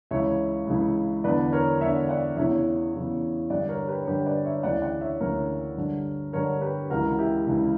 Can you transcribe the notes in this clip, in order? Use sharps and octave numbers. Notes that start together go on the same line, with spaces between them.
C#2 C#3 E3 C#5 E5
C#2 C#3 E3
E2 D3 B4 D5
A#4 C#5
E2 D3 C#5 E5
D5 F#5
E2 C#3 E3 C#5 E5
E2 C#3 E3
G2 D3 D5 F#5
A#4 C#5
G4 B4
C#5
G2 D3 G4 B4
B4 D5
C#5 E5
D2 C#3 E3 D5 F#5
D5 F#5
C#5 E5
D2 C#3 E3 A#4 C#5
G2 D3
G2 D3 A#4 C#5
G4 B4
C#2 C#3 E3 F#4 A#4
E4 G4
C#2 C#3 E3